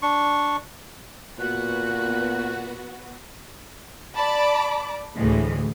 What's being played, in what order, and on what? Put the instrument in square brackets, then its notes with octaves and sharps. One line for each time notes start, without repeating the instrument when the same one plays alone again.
[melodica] D4 C#6
[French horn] A#2 [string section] B3 F#4 B4 [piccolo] F#6
[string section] D5 A5 B5 D6
D2 A2 E3 G#3